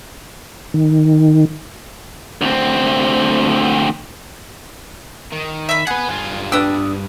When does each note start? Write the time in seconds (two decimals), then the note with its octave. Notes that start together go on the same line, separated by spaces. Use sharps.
0.74 D#3
2.41 D2 C4
5.32 D#3
5.69 E5 B5
5.87 G#4 B4 F#5
6.08 G2 F4
6.52 D4 B4 G5 D#6 E6